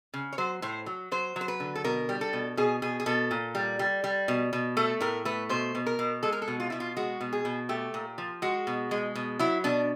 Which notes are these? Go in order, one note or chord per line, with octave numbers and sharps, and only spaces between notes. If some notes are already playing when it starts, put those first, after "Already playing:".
C#3
C#5
F#3 C5
A2 C5
F#3
F#3 C5
F#3
C5
B4
D3
A4
B2 A#4
G3
A4
B2
B2 G#4
B2 G#4
G#4
B2 A4
A#2
G3
G3
G3
B2
B2
A3 A4
A2 A#4
A3 B4
B2 C5
B2
A#4
B2
G#3 A4
A#4
A4
B2
F4
B2 E4
F4
G#3 F#4
B2
G#4
B2
A3 G4
A#2
F3
G#3 F#4
B2
G#3
B2
F#3 E4
B2 D4